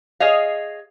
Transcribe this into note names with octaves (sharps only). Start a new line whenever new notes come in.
G#4 C#5 D#5 F5